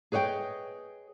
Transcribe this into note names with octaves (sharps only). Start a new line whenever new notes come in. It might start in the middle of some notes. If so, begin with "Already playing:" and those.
G#4 B4 C#5 D#5 G5